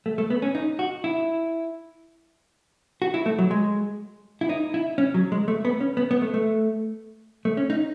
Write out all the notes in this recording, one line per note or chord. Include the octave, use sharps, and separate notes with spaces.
A3
A3
B3
C#4
D#4
F#4
E4
F#4
E4
A3
F#3
G#3
E4
D#4
E4
C#4
F#3
G#3
A3
B3
C#4
B3
B3
A3
A3
A3
C#4
D#4